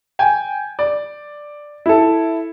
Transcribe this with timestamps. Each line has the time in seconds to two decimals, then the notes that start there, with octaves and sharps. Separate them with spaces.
0.19 G5 G#5
0.79 D5
1.86 E4 A4